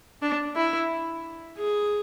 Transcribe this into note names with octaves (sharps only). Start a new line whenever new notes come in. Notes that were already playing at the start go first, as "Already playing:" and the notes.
D4
E4
G#4